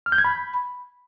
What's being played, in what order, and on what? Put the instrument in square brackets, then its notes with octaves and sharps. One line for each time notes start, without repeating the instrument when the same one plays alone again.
[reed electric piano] F6
G6
G#6
B5